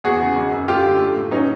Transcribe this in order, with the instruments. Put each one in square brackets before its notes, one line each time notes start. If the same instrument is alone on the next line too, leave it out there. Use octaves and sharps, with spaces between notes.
[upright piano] E2 F#4 G#4
C#3
G#1
F#2
A3 F4 G4
D3
A3
A2
F#3 C#4 D#4